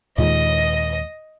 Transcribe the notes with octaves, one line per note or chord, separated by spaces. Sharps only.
D#2 A#2 G#3 D#5